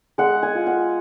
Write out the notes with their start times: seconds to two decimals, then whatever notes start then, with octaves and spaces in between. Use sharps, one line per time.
0.18 G#3 F#5
0.43 G#5
0.55 F4
0.67 F#5